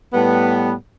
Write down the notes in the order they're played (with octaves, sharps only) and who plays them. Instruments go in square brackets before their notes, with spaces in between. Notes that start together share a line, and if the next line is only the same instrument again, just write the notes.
[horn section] A2 G3 B3